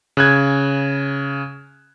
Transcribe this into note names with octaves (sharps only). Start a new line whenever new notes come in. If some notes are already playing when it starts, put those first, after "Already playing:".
C#3 F#6 G#6